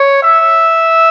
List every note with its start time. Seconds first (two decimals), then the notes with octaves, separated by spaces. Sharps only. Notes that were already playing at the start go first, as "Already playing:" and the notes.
Already playing: C#5
0.22 E5